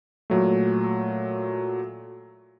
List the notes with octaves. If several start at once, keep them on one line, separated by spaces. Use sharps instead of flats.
A#2 F#3 A3